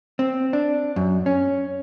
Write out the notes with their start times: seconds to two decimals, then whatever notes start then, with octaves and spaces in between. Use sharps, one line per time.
0.19 C4
0.53 D4
0.96 F#2
1.26 C#4